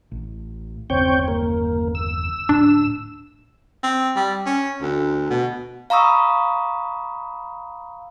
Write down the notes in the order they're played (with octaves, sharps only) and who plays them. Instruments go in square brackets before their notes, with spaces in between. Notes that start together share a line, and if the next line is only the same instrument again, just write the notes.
[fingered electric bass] A1
[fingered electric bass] G1 E2 C#3 [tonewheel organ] C4 C#5 G5
[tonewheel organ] A#3
E6
[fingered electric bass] D1 A2 [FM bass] D4
[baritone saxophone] C4
G3
C#4
D2
B2
[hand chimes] F5 A#5 B5 C#6 D#6 E6